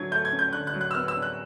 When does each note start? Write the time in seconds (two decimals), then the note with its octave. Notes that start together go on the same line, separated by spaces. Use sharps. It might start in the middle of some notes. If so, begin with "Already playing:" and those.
Already playing: D3 F#3 G#6
0.11 A3 G6
0.25 G#6
0.33 C#4
0.39 G6
0.53 D3 F#6
0.67 F#6
0.73 F#3
0.81 F#6
0.91 E6
0.94 B3 F6
1.08 E6
1.16 D4
1.22 F#6